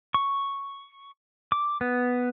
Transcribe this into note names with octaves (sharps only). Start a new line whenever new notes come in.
C#6
D6
B3